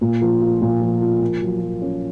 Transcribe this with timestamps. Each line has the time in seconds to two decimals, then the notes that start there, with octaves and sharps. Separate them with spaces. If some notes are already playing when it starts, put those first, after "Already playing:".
0.01 A#2
0.22 F3
0.42 F4
0.61 A#2
0.81 F3
1.02 F4
1.21 A#3
1.41 F#3
1.62 F#3
1.82 C#4